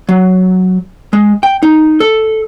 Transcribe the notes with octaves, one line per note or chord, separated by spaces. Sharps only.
F#3
G#3
G5
D#4
A4